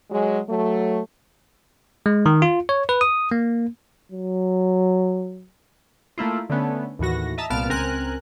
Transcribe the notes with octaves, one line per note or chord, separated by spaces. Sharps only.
F#3 G#3
F#3 A3
G#3
D#3
F4
C#5
B4
D#6
A#3
F#3
A3 A#3 E4 F4
D3 A3 B3 C#4
D#2 A2 E3 F#4 A#6
D#5 E5 A5 A#5
C2 A#2 B3 A5 F6 D7
C#2 C4 A#4 G#5 F#6